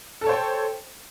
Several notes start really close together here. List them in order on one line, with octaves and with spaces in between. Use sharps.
A4 A5 C#5 C5 G5